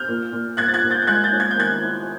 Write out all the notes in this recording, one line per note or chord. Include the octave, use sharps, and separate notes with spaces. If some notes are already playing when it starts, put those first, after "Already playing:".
Already playing: F6 G6
A#2
A#2
A#2 F#6 G#6
A6
F#6 G#6
A#2
G6 A6
G6
G#3 F#6 G#6
G6 A6
C#4
G#6
G6
D#3 F#6 G#6
E4